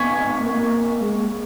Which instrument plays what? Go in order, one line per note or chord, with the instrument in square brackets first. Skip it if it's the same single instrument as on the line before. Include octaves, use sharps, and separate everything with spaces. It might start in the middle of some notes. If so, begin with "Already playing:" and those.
Already playing: [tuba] B3 [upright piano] G#5 C#6 G#6 B6
[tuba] A#3
G#3